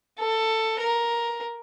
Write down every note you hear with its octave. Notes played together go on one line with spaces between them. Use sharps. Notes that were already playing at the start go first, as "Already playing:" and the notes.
A4
A#4